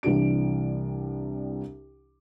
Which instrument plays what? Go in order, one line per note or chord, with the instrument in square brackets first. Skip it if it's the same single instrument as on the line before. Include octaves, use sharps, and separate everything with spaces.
[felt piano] C2 E3 D4 G4 D7